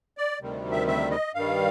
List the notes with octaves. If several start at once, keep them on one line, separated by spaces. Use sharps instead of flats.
D5
D2 C3 D#3 G3
E5
E5
D#5
G2 D#3 G3 F5